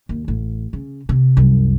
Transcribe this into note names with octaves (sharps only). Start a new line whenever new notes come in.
D#2
A1
C#3
C3
C2 F#2